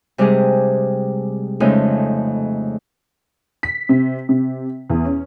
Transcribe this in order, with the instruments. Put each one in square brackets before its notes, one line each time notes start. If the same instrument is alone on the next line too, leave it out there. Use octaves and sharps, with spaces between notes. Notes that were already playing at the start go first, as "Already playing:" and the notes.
[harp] C3 G3 G#3 D4 G4 G#4
F2 C#3 G#3 A3 C#4 D#4
[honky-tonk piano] B6
C3
C3
E2
C#4